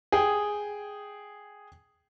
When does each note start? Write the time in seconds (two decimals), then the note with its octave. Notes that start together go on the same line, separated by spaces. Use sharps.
0.12 G#4 G5